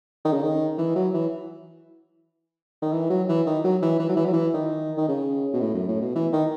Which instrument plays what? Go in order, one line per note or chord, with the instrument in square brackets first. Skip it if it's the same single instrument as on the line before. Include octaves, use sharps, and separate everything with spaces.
[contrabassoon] D#3
C#3
D#3
E3
F#3
E3
D#3
E3
F#3
E3
D#3
F#3
E3
E3
F#3
E3
F#3
E3
D#3
D#3
C#3
B2
A2
F#2
A2
B2
E3
D#3